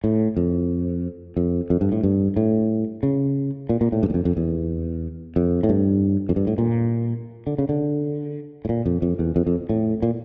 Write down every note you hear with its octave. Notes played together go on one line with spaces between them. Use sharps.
A2
F2
F2
F2
G2
A2
G2
A2
C#3
A#2
A#2
A2
G2
E2
F2
F2
E2
F2
A2
G2
F2
G2
A2
A#2
D3
C#3
D3
A2
A#2
F2
F2
E2
F2
F2
A2
A#2